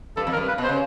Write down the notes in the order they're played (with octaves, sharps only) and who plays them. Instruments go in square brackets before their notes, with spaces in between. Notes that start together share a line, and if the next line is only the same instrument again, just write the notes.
[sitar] G2 [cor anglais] A4
[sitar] F2
[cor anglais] A#4
[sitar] G2
[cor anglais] B4
[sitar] B2
[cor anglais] C5
[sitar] C#3